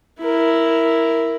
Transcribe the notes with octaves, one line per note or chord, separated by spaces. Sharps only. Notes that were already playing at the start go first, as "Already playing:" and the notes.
E4 A#4